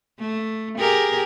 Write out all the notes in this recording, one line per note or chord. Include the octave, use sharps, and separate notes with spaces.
A3
G4 G#4 A#4